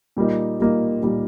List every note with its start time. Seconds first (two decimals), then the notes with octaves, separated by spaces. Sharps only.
0.17 A#2 G3 A#3 D#4
0.60 A#2 G3 A#3 D#4
1.02 A#2 G3 A#3 D#4